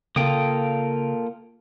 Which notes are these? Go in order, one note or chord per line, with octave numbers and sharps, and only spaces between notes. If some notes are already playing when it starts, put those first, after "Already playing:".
C#3 A#3 F4 A4 G5 D#6